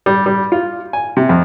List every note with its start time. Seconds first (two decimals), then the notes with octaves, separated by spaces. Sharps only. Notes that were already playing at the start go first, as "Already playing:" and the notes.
0.06 G3
0.26 G3
0.52 F4
0.93 G#5
1.17 C3
1.29 F2